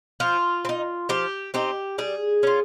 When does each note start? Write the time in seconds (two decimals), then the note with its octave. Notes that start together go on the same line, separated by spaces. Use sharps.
0.20 F3 F4
0.65 C4
0.69 D#4
1.09 F3 G4
1.54 C4 D#4 G4
1.98 G3 G#4
2.43 C#4 F4